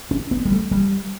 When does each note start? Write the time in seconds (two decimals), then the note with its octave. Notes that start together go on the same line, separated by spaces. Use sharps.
0.11 C#4
0.31 B3
0.45 G3
0.52 A3
0.71 G3